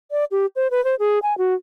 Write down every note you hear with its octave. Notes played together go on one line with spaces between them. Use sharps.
D5
G4
C5
B4
C5
G#4
G#5
F#4